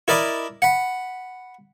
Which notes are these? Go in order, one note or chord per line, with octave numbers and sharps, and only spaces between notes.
E4 A#4 D5 D#5 B5
F#5 B5